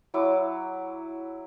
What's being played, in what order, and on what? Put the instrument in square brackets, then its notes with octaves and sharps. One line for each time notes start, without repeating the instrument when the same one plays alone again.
[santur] F#3 E4 D6